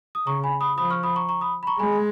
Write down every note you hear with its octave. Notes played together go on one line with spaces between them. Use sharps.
D#6
C#3 A#5 C#6
G#5 B5
B5 D#6
F3 B5 D#6
C#6 F6
B5 D#6
A#5 C#6
A#5 C#6
B5 D#6
B5
A#5 C#6
G#3 G#5 B5